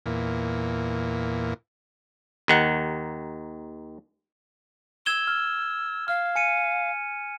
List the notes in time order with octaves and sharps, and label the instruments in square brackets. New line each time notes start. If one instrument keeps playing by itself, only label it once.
[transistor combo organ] E2 A#2
[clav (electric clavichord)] D#2 D#3 F#5
[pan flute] E6 [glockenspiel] G#6 E7 G7
[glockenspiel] F6
[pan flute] F5 [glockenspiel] F6
[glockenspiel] G#5 C#7 D#7